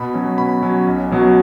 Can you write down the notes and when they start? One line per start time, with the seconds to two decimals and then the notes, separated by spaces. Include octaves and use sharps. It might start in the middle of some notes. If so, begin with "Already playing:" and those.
Already playing: B2 B5
0.14 F#3 C#4
0.38 B2 B5
0.63 F#3 C#4
0.87 B1
1.11 B2 F#3 C#4